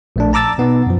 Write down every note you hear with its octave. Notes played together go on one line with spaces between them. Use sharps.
A#1 A3 D4
A5 A#5 D6 E6 A6
B2 B3 D#4
F#2 F3